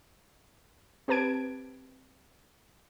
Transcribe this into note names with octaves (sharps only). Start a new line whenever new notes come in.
C4 G4 B4 A5 G#6 D7